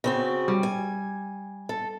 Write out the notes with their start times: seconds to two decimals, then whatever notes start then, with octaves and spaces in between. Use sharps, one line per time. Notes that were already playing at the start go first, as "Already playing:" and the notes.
0.04 C#3 C4 F#4
0.48 G3
0.63 G#5
1.69 A4